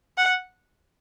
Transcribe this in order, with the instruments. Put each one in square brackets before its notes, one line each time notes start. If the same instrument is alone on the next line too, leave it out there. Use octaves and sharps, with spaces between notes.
[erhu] F#5